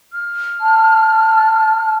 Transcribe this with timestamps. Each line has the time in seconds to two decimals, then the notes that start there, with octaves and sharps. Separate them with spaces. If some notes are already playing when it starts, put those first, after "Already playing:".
0.13 F6
0.60 A5